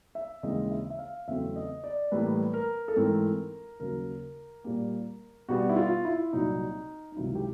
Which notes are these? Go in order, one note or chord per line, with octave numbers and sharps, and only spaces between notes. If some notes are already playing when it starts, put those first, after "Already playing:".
E5
D#2 C#3 E3 G#3 C4 D#5
E5
E5
F5
E2 C#3 F#3 A3 C4 E5
D#5
D5
A2 E3 G3 A#3 B4
A#4
A4
G#2 E3 A3 C4 A#4
D#2 C#3 F#3 A#4
A#2 G3 A#3
B2 G3 B3 F#4
E4
F4
E4
C2 A#2 F#3 D#4
D#4
C#2 C3 D#3 F#3 E4
G4